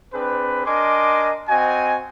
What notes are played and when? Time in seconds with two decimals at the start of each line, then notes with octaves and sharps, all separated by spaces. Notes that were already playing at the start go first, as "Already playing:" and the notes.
0.13 C4 D4 G#4 B4
0.66 D4 A#4 D#5 G#5 C6 D6
1.48 C4 F#4 D#5 G#5